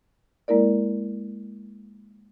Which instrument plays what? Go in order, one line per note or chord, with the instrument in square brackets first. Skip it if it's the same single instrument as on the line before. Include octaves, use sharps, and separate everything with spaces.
[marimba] G#3 A#3 E4 A#4 D5